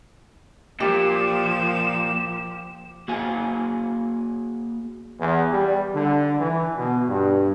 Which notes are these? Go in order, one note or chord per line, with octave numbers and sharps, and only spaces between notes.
A#2 F3 G4 E7
A#3 F#4 G#4 F5 G#5
E2
G3
D3
E3
B2
G2